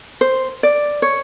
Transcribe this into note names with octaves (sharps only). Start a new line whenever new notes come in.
C5
D5
C#5